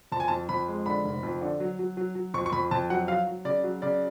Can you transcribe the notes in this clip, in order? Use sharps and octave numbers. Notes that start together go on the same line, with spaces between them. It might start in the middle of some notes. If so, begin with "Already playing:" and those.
F2 A5
G#5
F2 A5
F2 B5
G#3
D3 B5
F1
F2
D3
F#3
F#3
F#3
F#3
F2 C#6
C#6
F2 B5
F2 A5
F#3 F#5
F#3 F5
F#3
C#3 D5
F#3
C#3 D5